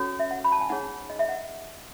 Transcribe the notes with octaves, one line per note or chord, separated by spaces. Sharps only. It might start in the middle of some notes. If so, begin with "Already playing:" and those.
Already playing: C#4 F#4 A4 C#5
E5
F#5
B5
A5
G#5
D#4 G#4 C#5 F#5
D#5
E5
F#5